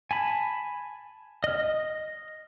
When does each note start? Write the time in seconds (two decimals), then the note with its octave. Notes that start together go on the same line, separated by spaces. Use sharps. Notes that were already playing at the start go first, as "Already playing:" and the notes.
0.11 G#5 A5 B5
1.44 D#5 F6